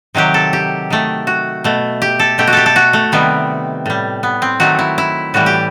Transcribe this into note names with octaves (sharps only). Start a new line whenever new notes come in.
C3 D#3 F#3 G4
A4
G4
D#3 A3
F#4
B2 A3
G4
A4
B2 A3 G4
F#4
G4 A4
A4
F#4
A3
C3 D#3 G3 B3
A2 G3
B3
C4
D#3 F#3 A3 F#4
E4
E4
A2 E3 G3 F#4
G4